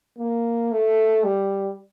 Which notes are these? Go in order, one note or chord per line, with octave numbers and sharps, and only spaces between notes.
A#3
A3
G3